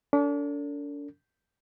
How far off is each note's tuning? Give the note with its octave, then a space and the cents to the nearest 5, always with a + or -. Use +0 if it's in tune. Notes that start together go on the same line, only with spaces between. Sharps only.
D4 -40 A4 +40